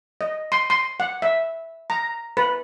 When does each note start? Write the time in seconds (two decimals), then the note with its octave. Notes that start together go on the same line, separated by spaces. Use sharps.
0.21 D#5
0.52 C6
0.70 C6
1.00 F#5
1.22 E5
1.90 A#5
2.37 B4